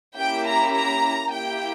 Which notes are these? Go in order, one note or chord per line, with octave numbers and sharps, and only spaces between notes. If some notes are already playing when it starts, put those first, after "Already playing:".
A#3 C#4 E4 G4 G5
A#5
A#5
A#3 E4 G4 G5